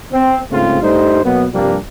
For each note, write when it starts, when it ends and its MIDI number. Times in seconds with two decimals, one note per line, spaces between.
0.12 0.40 60
0.51 0.80 44
0.51 0.80 49
0.51 0.80 57
0.51 0.80 60
0.51 0.80 65
0.82 1.21 43
0.82 1.21 55
0.82 1.21 57
0.82 1.21 63
0.82 1.21 72
1.24 1.46 47
1.24 1.46 54
1.24 1.46 58
1.24 1.46 59
1.53 1.77 43
1.53 1.77 48
1.53 1.77 53
1.53 1.77 55
1.53 1.77 58
1.53 1.77 62